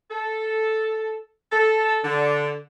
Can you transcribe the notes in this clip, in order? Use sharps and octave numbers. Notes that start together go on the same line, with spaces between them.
A4
A4
D3